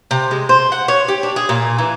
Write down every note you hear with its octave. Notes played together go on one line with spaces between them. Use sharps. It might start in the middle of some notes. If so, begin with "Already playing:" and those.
C3
G#3
C5
F#5
C#5
G4
D4
G#4
A#2
E3